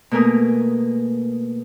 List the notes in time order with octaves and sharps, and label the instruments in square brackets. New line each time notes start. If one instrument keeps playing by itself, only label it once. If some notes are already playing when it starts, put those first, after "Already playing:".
[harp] B2 A3 A#3 A#4 G#5 D#6